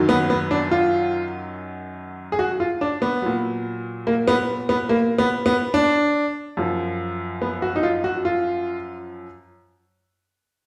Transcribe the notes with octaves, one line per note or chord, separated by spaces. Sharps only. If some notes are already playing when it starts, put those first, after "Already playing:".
Already playing: F#2 D#3 F#3
B3
B3
D4
F4
G#4
F#4
F4
D4
B3
A#2 F#3
A#3
B3
B3
A#3
B3
B3
D4
F#2 F3
B3
F#4
D#4
F4
F#4
F4